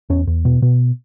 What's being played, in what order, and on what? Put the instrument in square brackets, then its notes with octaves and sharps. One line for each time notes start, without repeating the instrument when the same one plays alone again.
[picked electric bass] E2 C#4
E2
B2
B2